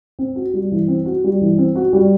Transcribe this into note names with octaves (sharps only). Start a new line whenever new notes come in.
C4
F#4
G3
E3
C4
F#4
G3
E3
C4
F#4
G3